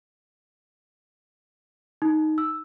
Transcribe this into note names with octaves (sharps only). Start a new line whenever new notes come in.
D#4
E6